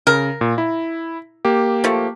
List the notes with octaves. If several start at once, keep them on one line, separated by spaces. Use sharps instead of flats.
C#3 A#4
A#2
E4
A#3 G4
F3 A3